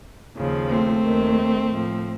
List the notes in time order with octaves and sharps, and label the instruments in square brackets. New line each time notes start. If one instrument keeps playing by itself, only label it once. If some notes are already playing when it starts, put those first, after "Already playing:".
[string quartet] D#2 C#3 F3
A3 C4
D#2 D#3
A2 F3